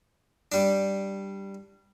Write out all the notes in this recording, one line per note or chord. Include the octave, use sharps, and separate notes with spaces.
G3 D4